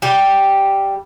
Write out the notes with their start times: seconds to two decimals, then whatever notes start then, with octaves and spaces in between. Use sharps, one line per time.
0.02 G3 G4